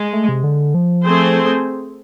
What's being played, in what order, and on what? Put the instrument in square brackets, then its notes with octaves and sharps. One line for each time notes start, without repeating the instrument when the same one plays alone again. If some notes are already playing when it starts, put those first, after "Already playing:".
Already playing: [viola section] G#3
[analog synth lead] A3
C3
D3
F3
[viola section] A3 C4 G#4 C5